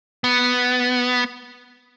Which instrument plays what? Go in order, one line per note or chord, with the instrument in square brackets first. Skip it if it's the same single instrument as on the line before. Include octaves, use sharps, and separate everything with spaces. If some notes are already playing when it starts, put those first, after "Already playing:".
[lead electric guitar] B3